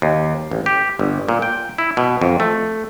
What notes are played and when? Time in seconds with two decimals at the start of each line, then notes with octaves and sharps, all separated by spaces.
0.02 D#2
0.51 A1
0.66 G4
0.99 G1
1.29 A#2
1.42 G5
1.78 E4
1.97 B2
2.22 F2
2.40 A3